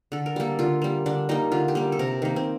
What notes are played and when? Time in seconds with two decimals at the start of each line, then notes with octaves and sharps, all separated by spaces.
0.12 D3 A4
0.26 A#4
0.36 G3 A#3 A4
0.59 D3 F4
0.82 G3 A#3
1.06 D3 D4
1.29 G3 A#3 D#4
1.52 D3 F4
1.68 G4
1.75 G3 A#3
1.92 A4
1.99 C3 A#4
2.22 D#3 A#3
2.36 C4